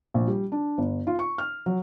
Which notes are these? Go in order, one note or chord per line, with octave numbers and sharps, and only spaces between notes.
A#1
G3
D4
G1
F4
C#6
F6
F#3